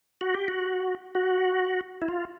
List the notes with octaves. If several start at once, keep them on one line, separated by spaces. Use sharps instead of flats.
F#4
G4
F#4
F#4
E4
F4